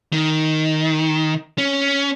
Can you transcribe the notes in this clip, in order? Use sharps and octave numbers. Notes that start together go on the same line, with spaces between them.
D#3
C#4